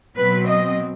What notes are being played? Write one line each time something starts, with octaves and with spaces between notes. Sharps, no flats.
B2 F#3 C4 B4
D#5